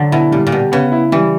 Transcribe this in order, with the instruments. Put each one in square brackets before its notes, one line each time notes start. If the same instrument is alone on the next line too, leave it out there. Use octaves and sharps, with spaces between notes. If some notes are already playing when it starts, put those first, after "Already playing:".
Already playing: [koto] D3 F#3
[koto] B2 [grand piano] E4
[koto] A#2 [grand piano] G3
[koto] A#2
[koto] B2 [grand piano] G4
[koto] C#3 [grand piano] B3
[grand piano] E4
[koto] E3 [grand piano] G3